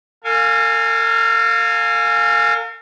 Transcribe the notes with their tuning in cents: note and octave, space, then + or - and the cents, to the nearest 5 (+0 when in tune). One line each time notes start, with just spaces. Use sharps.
A#4 -45 F5 +10 G#5 +0